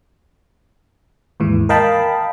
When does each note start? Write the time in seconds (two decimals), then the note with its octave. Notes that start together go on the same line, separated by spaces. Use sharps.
1.40 D#2 G#2 E3
1.69 A#4 D#5 F5 G5 A5 B5